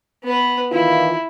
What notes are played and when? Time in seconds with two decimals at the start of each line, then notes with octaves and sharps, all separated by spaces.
0.24 B3 B4
0.72 D#3 E3 E4 F4